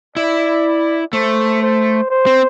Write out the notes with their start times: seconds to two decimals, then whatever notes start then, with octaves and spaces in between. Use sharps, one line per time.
0.16 E4 D5
1.13 A3 C5
1.62 C5
2.10 C5
2.26 C4